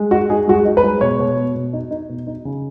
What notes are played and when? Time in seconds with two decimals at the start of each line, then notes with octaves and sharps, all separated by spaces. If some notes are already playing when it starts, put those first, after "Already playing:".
Already playing: G#3
0.11 D#4 F#4
0.30 D#4 G#4
0.48 G#3 F#4
0.53 G#4
0.65 D#4
0.77 B4
0.83 G#3
1.01 B2 C#5
1.19 B2
1.37 B2
1.55 B2
1.73 D#4
1.91 D#4
2.09 B2
2.27 D#4
2.45 C#3